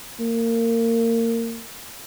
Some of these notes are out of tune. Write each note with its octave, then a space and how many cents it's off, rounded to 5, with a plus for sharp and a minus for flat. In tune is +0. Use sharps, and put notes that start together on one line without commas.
A#3 -25